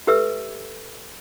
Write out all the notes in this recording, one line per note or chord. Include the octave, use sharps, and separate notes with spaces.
G4 A4 B4 E5 E6